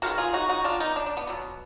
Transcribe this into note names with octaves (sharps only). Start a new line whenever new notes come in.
D#3 G#3 B3 F#4 A#4
F4 G#4
D#4 F#4
D#4 F#4
D4 F4
B3 D#4
D4
D4
B3
B2 F#3 B3